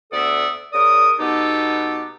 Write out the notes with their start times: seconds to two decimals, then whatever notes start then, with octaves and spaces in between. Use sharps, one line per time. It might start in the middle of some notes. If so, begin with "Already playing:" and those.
0.12 D2 B3 A4 D5 E5 D#6
0.72 C#3 A#4 D5 D#6
1.19 B2 B3 D#4 G4 A4